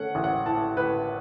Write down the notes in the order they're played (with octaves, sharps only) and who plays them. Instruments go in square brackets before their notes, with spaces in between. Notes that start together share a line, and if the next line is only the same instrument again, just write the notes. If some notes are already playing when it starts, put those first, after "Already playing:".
Already playing: [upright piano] A3 C#4 F#5
A1
F#5
A2 A5
A2 B4